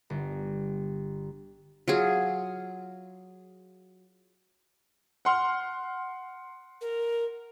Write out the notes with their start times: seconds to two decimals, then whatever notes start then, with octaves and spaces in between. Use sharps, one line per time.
0.10 G1
1.88 F#3 F4 G#4
5.25 F#5 C6 F6
6.81 A#4